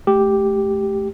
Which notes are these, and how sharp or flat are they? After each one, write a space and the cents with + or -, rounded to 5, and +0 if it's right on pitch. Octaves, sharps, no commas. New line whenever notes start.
A3 -25 G4 +0